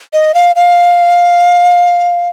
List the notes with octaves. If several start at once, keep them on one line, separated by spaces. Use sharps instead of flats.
D#5
F5
F5